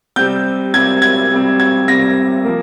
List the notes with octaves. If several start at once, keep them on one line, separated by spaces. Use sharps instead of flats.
C3 G3 C4 G6
C3 G3 C4 G#6
G#6
C3 G3 C4
G#6
C3 G3 C4 A#6
F3 A#3